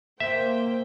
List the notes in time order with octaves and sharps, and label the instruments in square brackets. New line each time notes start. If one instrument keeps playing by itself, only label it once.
[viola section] A#3 C5 G5 [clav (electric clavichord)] E5